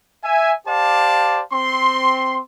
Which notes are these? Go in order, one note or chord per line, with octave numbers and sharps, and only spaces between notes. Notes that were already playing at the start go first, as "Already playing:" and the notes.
E5 G#5
G4 C5 D5 F5 A5
C4 C6